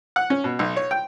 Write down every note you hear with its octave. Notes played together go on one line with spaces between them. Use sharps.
F#5
C#4
B2
B1
C#5
G5